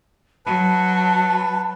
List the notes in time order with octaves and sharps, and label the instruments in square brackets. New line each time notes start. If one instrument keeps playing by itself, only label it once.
[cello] F#3 [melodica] B4 [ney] A5